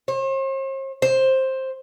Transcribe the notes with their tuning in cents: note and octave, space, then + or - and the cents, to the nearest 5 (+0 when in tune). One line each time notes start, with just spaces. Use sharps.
C5 +45
C5 +10